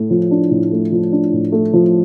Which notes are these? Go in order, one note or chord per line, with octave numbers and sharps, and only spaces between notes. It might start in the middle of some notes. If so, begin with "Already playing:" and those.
Already playing: A2 A3
F3
D4
A2
A3
F3
D4
A2
A3
F3